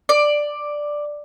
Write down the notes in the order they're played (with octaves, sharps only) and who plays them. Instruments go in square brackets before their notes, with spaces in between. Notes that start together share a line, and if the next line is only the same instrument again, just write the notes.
[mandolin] D5